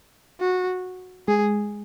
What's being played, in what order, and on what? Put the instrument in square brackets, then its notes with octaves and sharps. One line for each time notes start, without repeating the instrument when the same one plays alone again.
[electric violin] F#4
[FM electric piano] G#3 [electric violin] G#4